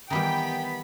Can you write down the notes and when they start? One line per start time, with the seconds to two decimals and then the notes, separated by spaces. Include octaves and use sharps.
0.10 D#3 E3 G3 B3 G5 B5